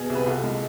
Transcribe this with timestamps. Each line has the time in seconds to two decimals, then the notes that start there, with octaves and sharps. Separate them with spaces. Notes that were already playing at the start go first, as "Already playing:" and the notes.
Already playing: B2 G#4
0.10 C2
0.15 B4
0.26 C2 F4 A4
0.43 G#3